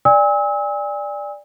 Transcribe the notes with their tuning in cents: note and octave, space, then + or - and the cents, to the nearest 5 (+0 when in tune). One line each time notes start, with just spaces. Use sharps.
D5 +0 G#5 -40 E6 -35